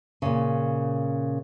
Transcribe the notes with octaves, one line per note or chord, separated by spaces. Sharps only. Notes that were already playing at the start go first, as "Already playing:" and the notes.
A#2 C#3